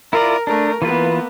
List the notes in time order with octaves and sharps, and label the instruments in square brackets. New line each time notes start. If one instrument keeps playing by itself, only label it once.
[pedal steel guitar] E4 F4 D5 [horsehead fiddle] A#4
[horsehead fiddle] A3 A#4 [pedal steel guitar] D4
[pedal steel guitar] E3 F4 B4 [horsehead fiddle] A#3 B3